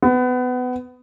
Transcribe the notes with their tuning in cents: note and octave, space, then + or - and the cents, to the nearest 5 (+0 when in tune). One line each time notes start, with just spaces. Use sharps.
B3 +25